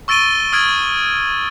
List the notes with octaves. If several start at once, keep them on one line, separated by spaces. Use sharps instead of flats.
C#6 E6 A6 D7 D#7 G7
D#6 F6 G#6 D7